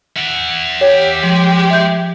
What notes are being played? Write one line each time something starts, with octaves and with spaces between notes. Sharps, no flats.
E5 F#5
G4 C#5
F3 G#3
E5 G6